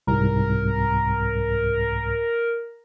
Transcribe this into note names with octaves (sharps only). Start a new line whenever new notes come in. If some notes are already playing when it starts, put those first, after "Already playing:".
C2 G#2 A#4